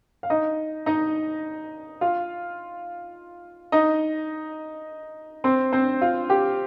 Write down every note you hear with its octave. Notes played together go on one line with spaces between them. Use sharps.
F5
D#4 D#5
D#4 D#5
F4 F5
D#4 D#5
C4 C5
C4 C5
F4
G4